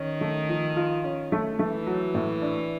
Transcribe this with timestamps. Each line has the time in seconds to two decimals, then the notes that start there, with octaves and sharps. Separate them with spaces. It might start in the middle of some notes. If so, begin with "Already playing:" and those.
Already playing: D#3 C#4
0.21 A3
0.49 F3
0.77 F4
1.04 C#4
1.32 A3
1.59 E3 A3
1.87 F#3
2.14 A2
2.42 D4